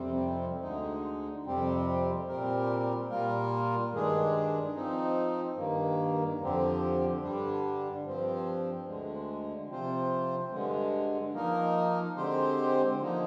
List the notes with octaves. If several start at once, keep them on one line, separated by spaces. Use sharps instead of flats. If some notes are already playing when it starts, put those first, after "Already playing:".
Already playing: F2 C3 G3 C4
D2 D3 G#3 D#4
F2 C3 G3 C4 G4
A#2 G3 C4 G4 A#4
A#2 G3 A#3 F4 A#4
G2 D#3 G#3 D4 G#4
F3 C4 D#4
G2 D#3 A#3
F2 D3 F3 C4 G4
G2 D3 G3 D4
G2 F3 C4
D2 D3 G#3
C3 F3 C4 F4 C5
G2 D3 G#3
F3 A#3 D#4 A#4
D3 G#3 C4 G4 C5
D3 F3 A#3 D#4